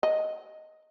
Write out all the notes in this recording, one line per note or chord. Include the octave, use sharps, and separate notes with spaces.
D#5